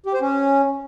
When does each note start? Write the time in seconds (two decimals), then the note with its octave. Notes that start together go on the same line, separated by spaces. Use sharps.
0.06 G4
0.14 C5
0.21 C#4